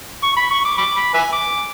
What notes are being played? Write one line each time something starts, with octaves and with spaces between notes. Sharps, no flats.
C#6
B5
C#6
D6
B5 D6
B5
B4 E5 G#5
D6